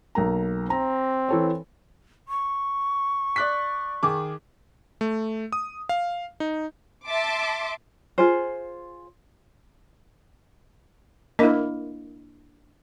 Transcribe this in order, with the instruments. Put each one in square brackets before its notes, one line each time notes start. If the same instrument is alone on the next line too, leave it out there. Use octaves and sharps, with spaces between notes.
[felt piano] B1 A#3 A#5
[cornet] C4 [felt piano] A#5
[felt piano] E3 A4 C#5
[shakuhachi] C#6
[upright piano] D5 F#6 B6
D#3 G#4 D6
[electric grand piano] A3
D#6
F5
D#4
[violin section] E5 A5 C6 D6
[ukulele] F4 G#4 C5
[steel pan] A#3 E4 [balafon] D4 A#4 D#5